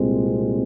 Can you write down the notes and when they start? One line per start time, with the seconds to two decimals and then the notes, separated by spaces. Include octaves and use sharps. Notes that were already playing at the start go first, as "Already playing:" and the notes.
Already playing: C2 A#2 G#3 C4